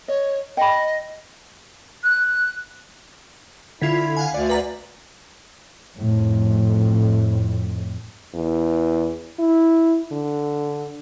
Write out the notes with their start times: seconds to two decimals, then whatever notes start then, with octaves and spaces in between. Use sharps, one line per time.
0.08 C#5 D#5
0.57 D#5 G5 B5
2.03 F#6
3.81 D3 E4 F4 G#6 B6
4.17 F5 F#5 G#5
4.34 D2 D5
4.49 B4 A#5
5.99 F2 A2
8.34 E2
9.39 E4
10.12 D3